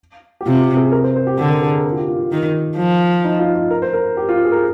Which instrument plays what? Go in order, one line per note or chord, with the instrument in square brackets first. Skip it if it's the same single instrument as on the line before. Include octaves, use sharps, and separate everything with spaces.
[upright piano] G4
[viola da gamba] C3 [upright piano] F4
[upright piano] G4
G#4
A#4
C5
C5
G4
[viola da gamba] D3 [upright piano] G4
[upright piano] A#4
G#4
A#4
A#4
F4
G4
F4
F4
[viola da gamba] D#3
F3
[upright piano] D#4
F4
F4
A#4
C5
A#4
G4
F4
G#4
A#4